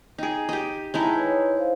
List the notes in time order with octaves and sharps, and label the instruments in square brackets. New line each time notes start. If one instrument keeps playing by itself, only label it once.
[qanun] D#4 G#4 [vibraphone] G5
[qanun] G4 D#5
[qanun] G#3 D#4 E4 [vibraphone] G5 A5 A#5
[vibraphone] B4 C#5
C5 D#5 F5